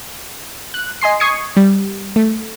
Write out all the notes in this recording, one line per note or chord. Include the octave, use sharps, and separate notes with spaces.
F#6
D#5 G#5 C6 C7
C#6 D#6 G#6 C7 C#7
G3
A3